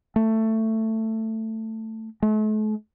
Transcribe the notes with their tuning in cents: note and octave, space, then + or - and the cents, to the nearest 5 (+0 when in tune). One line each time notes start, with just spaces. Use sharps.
A3 +15
A3 -40